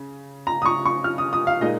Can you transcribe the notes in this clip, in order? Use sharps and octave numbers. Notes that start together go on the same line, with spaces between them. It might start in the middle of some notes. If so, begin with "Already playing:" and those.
Already playing: C#3
A#5
D#6
C#6
C#6
F6
D#6
D#6
F5
A#2 G#3 D#4 D#5